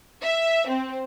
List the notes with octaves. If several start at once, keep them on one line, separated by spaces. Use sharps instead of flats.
E5
C4